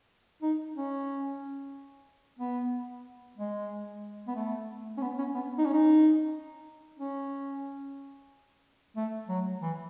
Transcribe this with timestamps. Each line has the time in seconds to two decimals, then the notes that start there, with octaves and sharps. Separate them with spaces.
0.42 D#4
0.75 C#4
2.39 B3
3.38 G#3
4.27 B3
4.36 A3
4.97 C#4
5.02 B3
5.18 C#4
5.35 B3
5.58 D#4
5.65 C#4
5.73 D#4
6.99 C#4
8.96 A3
9.29 F#3
9.62 E3